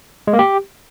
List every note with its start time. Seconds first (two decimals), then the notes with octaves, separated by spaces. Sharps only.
0.27 G#3
0.33 A#3
0.39 G4